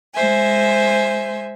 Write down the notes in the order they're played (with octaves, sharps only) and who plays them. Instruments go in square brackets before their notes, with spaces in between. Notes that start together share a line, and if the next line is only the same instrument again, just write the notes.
[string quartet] G#3 C5 E5 G#5